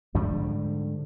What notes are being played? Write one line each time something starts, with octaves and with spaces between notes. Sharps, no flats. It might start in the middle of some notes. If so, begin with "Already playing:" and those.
G#2 D3 F3 G3